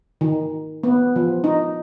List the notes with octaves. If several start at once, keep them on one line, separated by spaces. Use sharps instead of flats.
D#3
B3
F3
D#4